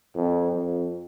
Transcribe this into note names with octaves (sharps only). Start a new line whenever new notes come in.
F2
F2